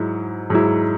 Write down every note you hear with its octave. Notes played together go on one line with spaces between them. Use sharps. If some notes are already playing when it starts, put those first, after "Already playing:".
Already playing: G#2 F#3 E4
G#2 F#3 E4